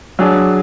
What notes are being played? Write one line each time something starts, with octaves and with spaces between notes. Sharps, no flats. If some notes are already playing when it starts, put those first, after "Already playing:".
F#3 D4 G#4